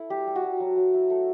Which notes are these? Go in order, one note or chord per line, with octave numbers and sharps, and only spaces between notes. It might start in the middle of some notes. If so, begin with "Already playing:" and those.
Already playing: E4 A4
G3 G4
G3
F#4
G3
F#3
F#3
E4
A3